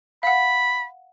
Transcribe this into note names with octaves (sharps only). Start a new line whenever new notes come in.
F5 F#5 B5